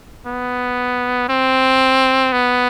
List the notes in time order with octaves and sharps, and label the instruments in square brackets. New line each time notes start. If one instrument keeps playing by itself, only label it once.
[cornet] B3
C4
B3